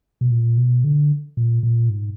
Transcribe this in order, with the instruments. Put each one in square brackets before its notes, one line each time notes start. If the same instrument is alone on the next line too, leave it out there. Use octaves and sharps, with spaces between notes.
[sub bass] B2
A#2
B2
D3
A#2
A#2
G#2